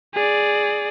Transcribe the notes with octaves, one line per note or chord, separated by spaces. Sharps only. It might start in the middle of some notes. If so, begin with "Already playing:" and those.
G#4 D5